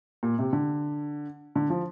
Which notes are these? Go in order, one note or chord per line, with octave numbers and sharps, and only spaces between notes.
A#2
C3
D3
D3
F3